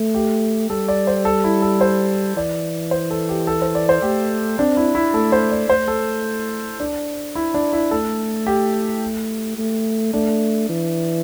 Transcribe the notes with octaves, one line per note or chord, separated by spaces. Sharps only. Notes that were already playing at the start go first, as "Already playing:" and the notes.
Already playing: A3
G4
G3 A4
D5
C5
A4
E4
A4
C5
E3 D5
C5
A4
G4
A4
C5
D5
C5
A3 G4
C4 D4
E4
E4
A3 A4
C5
D5
A3 C5
A4
D4
E4
D4
E4
A3 A4
G4
A3
A3 D4
E3